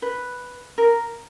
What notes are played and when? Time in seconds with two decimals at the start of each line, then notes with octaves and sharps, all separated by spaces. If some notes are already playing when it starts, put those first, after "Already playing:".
0.02 B4
0.78 A#4